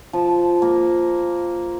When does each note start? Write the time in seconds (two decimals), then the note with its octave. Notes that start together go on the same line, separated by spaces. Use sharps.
0.13 F3
0.62 A#3